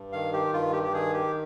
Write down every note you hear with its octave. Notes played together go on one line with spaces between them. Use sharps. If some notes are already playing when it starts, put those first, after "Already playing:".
Already playing: G2
D#3 F5
G4
G2 F4
G4
G4
D#3 G#4
G4